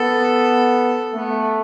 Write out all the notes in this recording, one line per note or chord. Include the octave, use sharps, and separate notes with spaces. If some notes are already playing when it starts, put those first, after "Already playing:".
Already playing: B3 A4
A3 B3